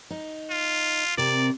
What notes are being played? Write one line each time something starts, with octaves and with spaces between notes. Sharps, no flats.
D#4
F4
C3 C4 A#4 D5